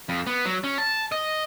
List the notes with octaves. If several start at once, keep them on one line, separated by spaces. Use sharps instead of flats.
F2
B3
F#3
C#4
A5
D#5